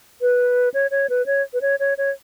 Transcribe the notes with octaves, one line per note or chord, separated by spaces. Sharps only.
B4
C#5
C#5
B4
C#5
B4
C#5
C#5
C#5